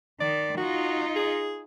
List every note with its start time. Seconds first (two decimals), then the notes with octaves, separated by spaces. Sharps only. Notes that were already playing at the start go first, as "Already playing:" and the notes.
0.20 D#3 D5
0.57 D#4 F4 F#4
1.16 G#4